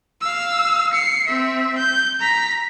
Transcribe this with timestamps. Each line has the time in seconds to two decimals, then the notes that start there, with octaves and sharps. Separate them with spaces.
0.21 F5 E6
0.93 C7 C#7
1.27 C4 E5
1.77 G6
2.20 A#5 B6